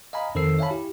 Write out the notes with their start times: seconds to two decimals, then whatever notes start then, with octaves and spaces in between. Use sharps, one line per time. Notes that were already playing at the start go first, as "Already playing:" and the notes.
0.13 D#5 F5 G#5 A#5 B5
0.35 F2 D#3 A4 C5 E6 C7
0.59 C#5 E5 F5 G#5 A5 B5
0.71 E4 G4